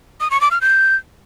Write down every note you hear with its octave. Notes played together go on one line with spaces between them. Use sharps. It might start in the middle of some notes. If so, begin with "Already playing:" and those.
D#6
C#6
D6
F6
G6